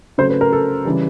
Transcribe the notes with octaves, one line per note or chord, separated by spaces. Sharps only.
C#3 F#3 A3 C5
B4
A#4
A4
C#3 E3 G3